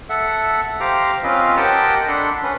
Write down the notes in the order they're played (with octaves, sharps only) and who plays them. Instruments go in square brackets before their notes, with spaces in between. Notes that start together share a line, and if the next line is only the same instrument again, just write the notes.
[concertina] A4 E5 F#5
G4 C5 F5 A#5 D6
C4 C#4 F4 B4 D#5 F5
G4 A#4 D#5 F#5 G5 A5
D4 A4 F#5 B5 C6
C#4 B4